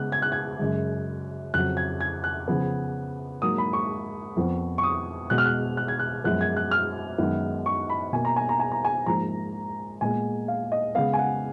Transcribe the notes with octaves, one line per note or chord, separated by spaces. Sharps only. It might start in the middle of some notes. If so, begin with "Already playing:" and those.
Already playing: C#3 G#3 B3 F#6
G#6
F#6
G#6
F#2 C#3 G#3
F2 C#3 F#3 F#6
G#6
G#6
F#6
C#3 F3 B3
G#2 F#3 A#3 D#6
B5
C#6
F2 F3 B3
C#6
D#6
B2 G#3 B3 F#6
F6
F#6
F#6
G#6
F#6
F#2 F3 G#3 B3 F#6
G#6
F#6
F6
F#2 D#3 G#3 B3
C#6
B5
B2 A#3 G#5
A#5
G#5
A#5
G#5
A#5
G#5
G#2 F3 A#3 A#5
A#2 G#3 B3 G#5
F5
D#5
C#3 G#3 B3 F5
G#5
F#5